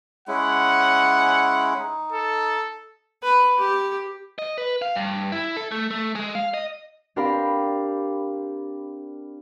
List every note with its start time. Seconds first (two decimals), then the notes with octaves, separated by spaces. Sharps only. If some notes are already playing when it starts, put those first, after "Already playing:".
0.28 G#3 C#4 E4 F#5
1.78 D#4
2.12 A4
3.23 B4
3.58 G4
4.39 D#5
4.58 B4
4.82 F5
4.96 G2
5.32 E4
5.57 A4
5.72 A3
5.91 A3
6.15 G#3
6.35 F5
6.54 D#5
7.16 C4 D4 G4 A#4 F5 B5